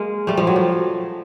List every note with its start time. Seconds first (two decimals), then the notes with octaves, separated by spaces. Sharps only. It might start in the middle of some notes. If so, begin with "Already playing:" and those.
Already playing: G#3 A#3
0.27 G3 A3
0.37 F3 G3
0.47 F#3
0.56 F3